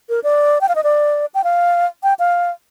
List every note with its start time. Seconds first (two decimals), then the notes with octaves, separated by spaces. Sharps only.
0.09 A#4
0.24 D5
0.61 G5
0.69 F5
0.75 D#5
0.84 D5
1.34 G5
1.44 F5
2.03 G5
2.19 F5